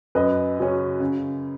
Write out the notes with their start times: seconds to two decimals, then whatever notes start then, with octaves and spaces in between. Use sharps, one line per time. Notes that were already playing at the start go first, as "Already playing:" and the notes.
0.15 F#2 B4 D#5
0.59 C#3 F#3 C#4
1.00 C#3